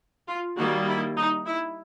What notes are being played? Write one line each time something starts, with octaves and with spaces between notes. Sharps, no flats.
F4
D#3 G3 A#3 F#4
E4
D#4
E4